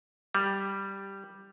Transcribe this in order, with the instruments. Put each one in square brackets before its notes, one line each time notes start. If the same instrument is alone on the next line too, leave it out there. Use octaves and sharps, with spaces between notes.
[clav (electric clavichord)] G3